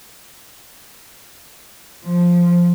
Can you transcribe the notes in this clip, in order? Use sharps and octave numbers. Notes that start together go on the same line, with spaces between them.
F3